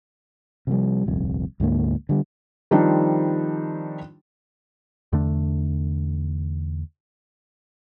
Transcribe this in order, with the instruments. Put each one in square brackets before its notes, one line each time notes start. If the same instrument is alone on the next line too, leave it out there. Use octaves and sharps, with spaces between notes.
[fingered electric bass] C3 F3 G3
D#1 C2 F2
D2 G#2 D3 A#3
D3 G3
[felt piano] D#3 F3 G3 C4 D4 D#4
[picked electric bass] E2 D3 A3 D4